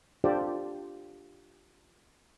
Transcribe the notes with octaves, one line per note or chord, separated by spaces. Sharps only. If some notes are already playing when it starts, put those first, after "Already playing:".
D4 F4 G4 A4 C5 D5